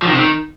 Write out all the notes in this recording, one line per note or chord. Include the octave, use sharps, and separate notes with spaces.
F3
D#3
C3
D#3